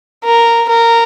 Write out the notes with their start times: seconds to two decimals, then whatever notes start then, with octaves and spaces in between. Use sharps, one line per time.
0.24 A#4
0.69 A#4